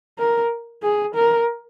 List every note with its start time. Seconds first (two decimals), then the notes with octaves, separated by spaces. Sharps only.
0.18 A#4
0.83 G#4
1.15 A#4